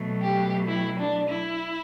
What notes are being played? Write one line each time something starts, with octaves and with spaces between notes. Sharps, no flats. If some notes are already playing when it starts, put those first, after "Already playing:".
Already playing: B2 F#3 A3
G4
E4
D4
E4